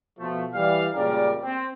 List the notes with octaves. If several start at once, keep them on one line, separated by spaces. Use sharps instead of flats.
B2 F3 A3
E3 G3 F5
C#2 A#2 C#3 G3 A#4 D5
C4